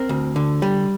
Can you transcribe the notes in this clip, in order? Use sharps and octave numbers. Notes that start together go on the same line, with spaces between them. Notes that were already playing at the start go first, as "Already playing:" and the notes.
Already playing: C4 A#4
D2
D3
G3